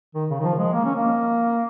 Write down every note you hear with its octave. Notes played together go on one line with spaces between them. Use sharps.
D#3
C#3
D#3
F3
G#3
A#3
C#4
A#3